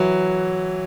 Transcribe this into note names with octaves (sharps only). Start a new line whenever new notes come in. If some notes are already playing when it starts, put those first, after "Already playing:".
Already playing: E3 F#3